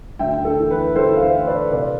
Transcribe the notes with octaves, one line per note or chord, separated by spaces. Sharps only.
D2 E5 G5
A4
E3
B4
D2 A4 C5
F5
C5 E5
E3
B4 D5
C3 B4 D5